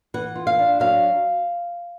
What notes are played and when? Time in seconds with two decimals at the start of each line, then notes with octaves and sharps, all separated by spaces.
0.14 E3 F#5
0.36 F4
0.47 F5
0.59 D4
0.80 F#3 F5